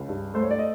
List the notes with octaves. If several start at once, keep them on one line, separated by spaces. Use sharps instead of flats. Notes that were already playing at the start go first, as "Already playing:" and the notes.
Already playing: C#2
G2
A3 C5
C#5
D5
D#5